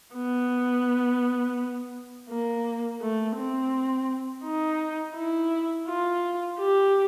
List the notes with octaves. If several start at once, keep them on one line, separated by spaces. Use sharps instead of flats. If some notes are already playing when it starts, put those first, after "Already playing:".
B3
A#3
A3
C4
D#4
E4
F4
G4